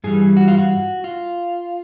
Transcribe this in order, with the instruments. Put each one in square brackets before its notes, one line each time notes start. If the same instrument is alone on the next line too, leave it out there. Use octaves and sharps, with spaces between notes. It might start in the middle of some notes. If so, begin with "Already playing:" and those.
[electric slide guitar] G2 E3 G3 G#4
F#4
F4
F#4
F4